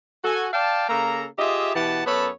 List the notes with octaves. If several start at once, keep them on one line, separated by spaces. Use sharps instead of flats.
F#4 A4 G#5
D5 F5 G5 A5
C#3 A#3 A4 A#5
F4 G4 G#4 D#5 E5
B2 E3 G4 F#5 A5
F#2 B3 A4 C#5 A5 B5